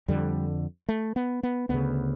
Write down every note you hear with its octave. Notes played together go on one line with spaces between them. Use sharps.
F2 D3 G3
A3
B3
B3
D2 C#3 B3